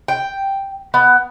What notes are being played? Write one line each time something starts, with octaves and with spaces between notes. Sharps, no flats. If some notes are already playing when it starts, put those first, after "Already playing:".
G5
B3